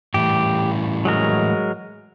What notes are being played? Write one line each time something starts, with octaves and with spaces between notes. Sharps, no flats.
A2 E3 G3 G4
F#3 G#3 A#4